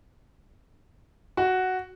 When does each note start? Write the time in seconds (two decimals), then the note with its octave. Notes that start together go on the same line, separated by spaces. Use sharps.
1.37 F#4